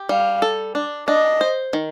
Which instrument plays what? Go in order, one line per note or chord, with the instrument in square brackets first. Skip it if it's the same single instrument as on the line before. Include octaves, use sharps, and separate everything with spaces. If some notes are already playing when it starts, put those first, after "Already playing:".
Already playing: [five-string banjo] G4
[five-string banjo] G3 [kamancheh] F5
[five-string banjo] A4
D4
[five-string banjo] D4 [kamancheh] D#5
[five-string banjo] C5
D#3